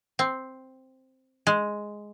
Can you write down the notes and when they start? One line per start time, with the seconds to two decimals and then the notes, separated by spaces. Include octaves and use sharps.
0.19 C4
1.47 G#3